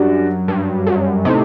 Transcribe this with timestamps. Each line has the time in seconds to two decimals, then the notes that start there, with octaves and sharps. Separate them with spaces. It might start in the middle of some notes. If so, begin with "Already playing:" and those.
Already playing: F#2 G3 D4 F#4
0.48 G2
0.87 F#2
1.25 A2 C3 A3 D#4